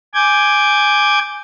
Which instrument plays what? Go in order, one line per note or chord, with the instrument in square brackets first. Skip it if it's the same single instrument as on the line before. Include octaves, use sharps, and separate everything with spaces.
[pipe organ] G#5 D6 G6 G#6